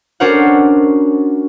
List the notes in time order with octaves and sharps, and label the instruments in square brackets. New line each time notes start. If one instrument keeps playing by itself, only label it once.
[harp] C#4 D4 F#4 A#4 C5 F#5